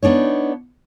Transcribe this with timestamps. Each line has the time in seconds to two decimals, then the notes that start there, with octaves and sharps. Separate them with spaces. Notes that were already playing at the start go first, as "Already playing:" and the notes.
0.03 B3 D4 D#4 C#5